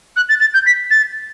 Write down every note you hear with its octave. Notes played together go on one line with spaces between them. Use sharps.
F#6
A6
A6
G6
B6
A6